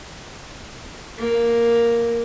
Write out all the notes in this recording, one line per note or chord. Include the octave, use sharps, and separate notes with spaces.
A#3